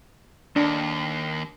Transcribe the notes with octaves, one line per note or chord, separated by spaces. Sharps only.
D#2 D4